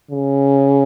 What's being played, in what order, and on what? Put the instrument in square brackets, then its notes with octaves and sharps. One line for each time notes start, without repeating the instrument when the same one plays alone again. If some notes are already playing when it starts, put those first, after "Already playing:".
[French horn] C#3